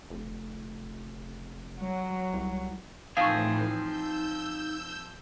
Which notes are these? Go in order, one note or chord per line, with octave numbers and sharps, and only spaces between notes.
F1
F#3
C2
A2 E3 F3 C4 D#4 G#4 F5 C#6
E6 G6